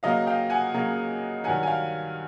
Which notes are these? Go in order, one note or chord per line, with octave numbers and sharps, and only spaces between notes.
C#3 F#3 A#3 D#5 F5
F5 G5
F#5 G#5
C#3 F#3 A#3
G2 D#3 F#3 F#5 G#5
G#5
F5 G5